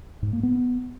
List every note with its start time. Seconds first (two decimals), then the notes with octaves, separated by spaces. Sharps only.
0.22 G#2
0.33 A#3
0.43 B3